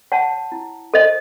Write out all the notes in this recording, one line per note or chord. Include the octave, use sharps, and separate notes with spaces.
C#5 F#5 A5
E4
A4 C5 D#5